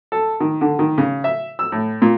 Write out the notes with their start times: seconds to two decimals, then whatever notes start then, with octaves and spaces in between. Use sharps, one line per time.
0.12 A4
0.40 D#3
0.61 D3
0.79 D#3
0.98 C#3
1.24 E5
1.59 E6
1.72 A2
2.02 A#2